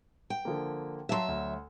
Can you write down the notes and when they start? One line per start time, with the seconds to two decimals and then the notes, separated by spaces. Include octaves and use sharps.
0.30 G5
0.45 D3 F3 A#3
1.09 F#3 E5 F5 A5 C6
1.28 D2